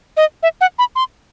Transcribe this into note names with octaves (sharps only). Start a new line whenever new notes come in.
D#5
E5
F#5
B5
C6